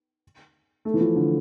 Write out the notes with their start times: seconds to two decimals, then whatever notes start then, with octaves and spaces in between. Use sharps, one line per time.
0.85 A3
0.94 E3
1.01 F3
1.16 D3